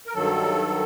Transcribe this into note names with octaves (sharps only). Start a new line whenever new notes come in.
A#4
G2 D#3 F#3 A4